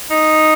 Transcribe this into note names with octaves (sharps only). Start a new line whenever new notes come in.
D#4